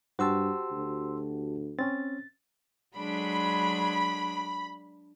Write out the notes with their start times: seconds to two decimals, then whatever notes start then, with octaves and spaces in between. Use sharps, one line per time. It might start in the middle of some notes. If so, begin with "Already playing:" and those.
0.19 G2 F#4 G4 C5 A5 C6 E6
0.72 D2
1.79 C4 C#4 A6
2.97 F#3 G#3 D4 B5